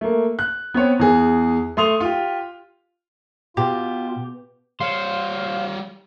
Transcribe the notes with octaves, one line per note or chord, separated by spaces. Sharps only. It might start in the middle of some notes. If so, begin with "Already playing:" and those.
A3 A#3
F#6
B3 C4 C#5
E2 G#4
A3 C6 D#6 F7
F4 G4
B2 F4 G4
G3 C5 C#5 F5